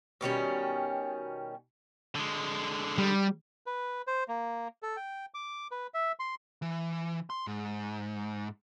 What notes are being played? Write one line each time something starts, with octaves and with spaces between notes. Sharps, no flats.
B2 D#3 G3 C#4
D3 G#3
G3
B4
C5
A#3
A4
G5
D6
B4
E5
C6
E3
C6
G#2